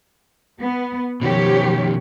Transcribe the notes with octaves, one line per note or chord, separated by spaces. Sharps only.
B3
B2 D#3 F3 G4 C#5